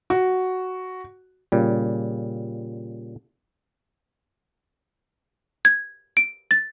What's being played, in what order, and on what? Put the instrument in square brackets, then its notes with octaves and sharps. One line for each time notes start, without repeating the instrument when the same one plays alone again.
[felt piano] F#4
[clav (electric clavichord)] A#2 C#3 G3
[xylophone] G#6
D7
A6